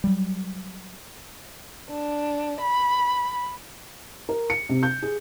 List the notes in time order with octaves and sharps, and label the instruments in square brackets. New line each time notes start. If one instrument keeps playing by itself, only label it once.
[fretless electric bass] F#3 G3
[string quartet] D4
B5
[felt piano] A#4
C#7
C3
G6
G#4